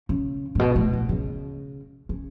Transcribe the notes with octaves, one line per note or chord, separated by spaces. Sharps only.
C#3
A2
B2
A2
B2
C#3
C#3